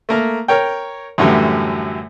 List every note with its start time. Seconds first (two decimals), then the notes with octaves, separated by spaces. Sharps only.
0.09 A3 A#3 A#4
0.48 A#4 C#5 G5
1.18 F#2 A2 D3 E3 F#3 G3